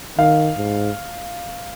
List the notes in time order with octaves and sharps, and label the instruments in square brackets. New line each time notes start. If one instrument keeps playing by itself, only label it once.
[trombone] D#3 [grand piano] F5
[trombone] G#2